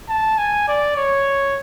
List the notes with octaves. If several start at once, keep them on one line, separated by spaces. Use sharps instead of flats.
A5
G#5
D5
C#5